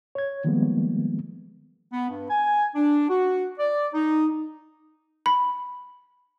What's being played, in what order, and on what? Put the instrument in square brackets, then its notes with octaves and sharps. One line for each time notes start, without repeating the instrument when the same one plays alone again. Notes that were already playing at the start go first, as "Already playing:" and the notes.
[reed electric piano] C#5 G#6
D#3 F3 G3 G#3 A#3 B3
[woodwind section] B3
G2
G#5
D4
F#4
D5
D#4
[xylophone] B5